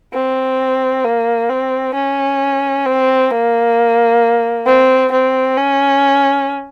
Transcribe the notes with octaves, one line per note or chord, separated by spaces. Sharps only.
C4
A#3
C4
C#4
C4
A#3
C4
C4
C#4